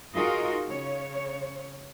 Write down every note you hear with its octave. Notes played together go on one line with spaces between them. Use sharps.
D#4 F4 F#4 G#4 A#4 D#5
C#3 C#5